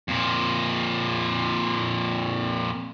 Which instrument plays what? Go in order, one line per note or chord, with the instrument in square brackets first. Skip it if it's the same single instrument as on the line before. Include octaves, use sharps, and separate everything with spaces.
[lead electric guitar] F2 A#2